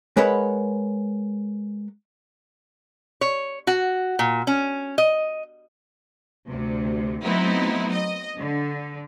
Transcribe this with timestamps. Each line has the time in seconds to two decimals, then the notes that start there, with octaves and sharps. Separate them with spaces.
0.17 G#3 A#4 B4 C#5 F#5 B5
3.21 C#5
3.67 F#4
4.19 A#2
4.47 C#4
4.98 D#5
6.47 D2 C3
7.24 F#3 A3 B3 C4 D#4 E4
7.92 D#5
8.36 D3